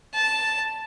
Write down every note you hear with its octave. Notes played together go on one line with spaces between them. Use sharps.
A5